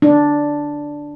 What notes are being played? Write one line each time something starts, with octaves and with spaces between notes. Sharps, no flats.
D4